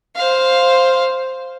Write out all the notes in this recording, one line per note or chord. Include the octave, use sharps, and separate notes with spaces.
C5 F5